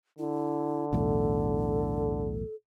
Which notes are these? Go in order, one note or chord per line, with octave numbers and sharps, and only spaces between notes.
D3 E4
B1 E2 A2 A4